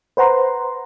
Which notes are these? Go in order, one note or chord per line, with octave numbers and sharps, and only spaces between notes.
B4 C5 F#5 A#5 C6